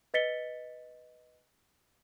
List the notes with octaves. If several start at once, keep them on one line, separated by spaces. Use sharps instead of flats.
B4 D#5 A6 B6 C#7 G7